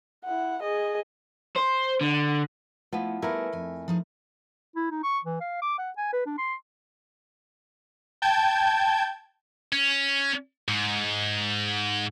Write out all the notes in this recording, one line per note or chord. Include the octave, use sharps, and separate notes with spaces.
E4 F#5
G#4 D#5
C5
D3
F3 A3 B3 E4
G3 A3 B3 E4 A#4 G#5
F2 G#5
F3 D#4 G#4
E4
D#4
C#6
E3
F5
D6
F#5
G#5
B4
D4
C6
G5 A5 G6 G#6
C#4
G#2